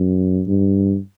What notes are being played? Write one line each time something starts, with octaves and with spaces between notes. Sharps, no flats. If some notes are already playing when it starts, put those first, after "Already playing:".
Already playing: F#2
G2